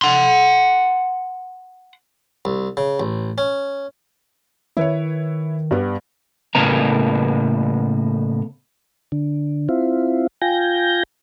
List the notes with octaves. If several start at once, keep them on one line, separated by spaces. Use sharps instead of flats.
F#5 C6
C2
C#3
A1
C#4
D#3 E4 B4 C#5
G2 G3 B3
A2 C#3 A#3 B3 A#5
D3
C4 E4 F4
F4 G5 G#5 G6 A#6